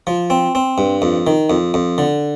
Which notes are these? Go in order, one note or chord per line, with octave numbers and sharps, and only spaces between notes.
F3
C4
C4
G2
F2
D#3
F2
F2
D3